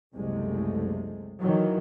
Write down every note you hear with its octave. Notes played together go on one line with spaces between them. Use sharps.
F#1 C2 C3 G#3 A3
D#3 E3 F#3